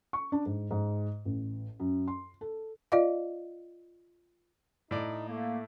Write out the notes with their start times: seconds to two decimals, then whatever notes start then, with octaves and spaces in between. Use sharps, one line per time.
0.13 C#6
0.32 D4
0.46 G#2
0.71 G#2
1.25 A1
1.80 F#2
2.08 C6
2.41 A4
2.92 F4 D5 D#5 F5
4.91 A2 D#4 D5
5.29 A3 A#3